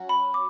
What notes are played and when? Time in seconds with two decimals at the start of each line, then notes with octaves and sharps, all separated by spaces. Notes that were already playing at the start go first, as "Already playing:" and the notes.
Already playing: F#3 C#4 F#4
0.09 B5
0.34 D6